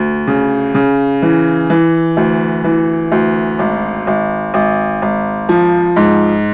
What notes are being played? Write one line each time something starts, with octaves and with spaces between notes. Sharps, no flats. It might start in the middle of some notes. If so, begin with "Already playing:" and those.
Already playing: D2
C#3
C#3
E3
E3
D2
E3
D2
G#1
G#1
G#1
G#1
F3
G#2